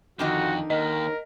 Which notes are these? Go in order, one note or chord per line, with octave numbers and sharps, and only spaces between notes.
F2 D3 D#3 D#4 F#4
D#2 A#4 D#5